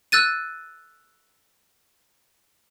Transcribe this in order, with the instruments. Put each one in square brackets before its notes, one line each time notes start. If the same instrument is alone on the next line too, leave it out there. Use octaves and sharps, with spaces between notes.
[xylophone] E6 F#6 A6 D#7